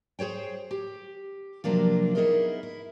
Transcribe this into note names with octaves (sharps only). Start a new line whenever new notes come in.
G#4 C5 C#5 G5
G4
C3 F3 F#3 A#3 D4 F4
B3 D#4 E4 G#4 A#4 D#5
E4